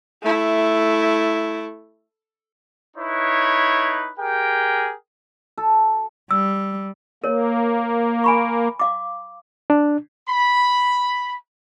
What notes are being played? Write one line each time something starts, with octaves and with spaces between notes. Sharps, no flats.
A3 E4
D#4 E4 B4 C#5
G4 G#4 A#4 G5
A4
G3 E6
A#3 A#4 C#5
G#5 B5 C#6
F5 D6
D4
B5